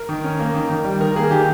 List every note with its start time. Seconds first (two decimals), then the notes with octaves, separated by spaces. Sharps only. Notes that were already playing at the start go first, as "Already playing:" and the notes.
Already playing: A#4
0.09 D#3
0.24 C#4
0.39 A#3
0.54 D#3
0.69 D#3
0.85 G3
1.01 D#3 A#4
1.16 A#3 G#4
1.31 D#3 G4